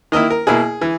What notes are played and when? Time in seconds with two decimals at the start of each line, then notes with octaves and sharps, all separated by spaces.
0.12 D#3 A#3 E4 D#5
0.30 A#4
0.47 B2 A#3 E4 G#4
0.81 E3